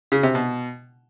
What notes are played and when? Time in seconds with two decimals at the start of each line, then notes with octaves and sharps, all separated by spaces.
0.12 C#3
0.23 C3
0.35 B2